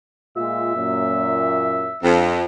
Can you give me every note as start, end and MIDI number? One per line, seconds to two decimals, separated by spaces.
0.37 0.75 46
0.37 0.75 56
0.37 0.75 65
0.37 2.10 76
0.76 1.90 42
0.76 1.90 46
2.03 2.44 41
2.03 2.29 62